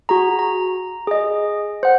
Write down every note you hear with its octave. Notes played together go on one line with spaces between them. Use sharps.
F#4 G#4 A#5
A#5
G#4 D#5
C5 F#5